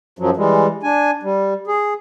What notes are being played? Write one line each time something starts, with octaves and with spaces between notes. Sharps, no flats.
F#2 F3 F#3
E3 G3 G#3
D4 G#5
G3
G#4